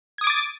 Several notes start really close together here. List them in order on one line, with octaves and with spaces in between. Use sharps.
G#6 D#6 D7 D6 A6